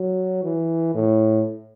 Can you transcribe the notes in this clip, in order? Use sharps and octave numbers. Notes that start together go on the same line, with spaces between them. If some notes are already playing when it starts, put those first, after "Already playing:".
Already playing: F#3
E3
A2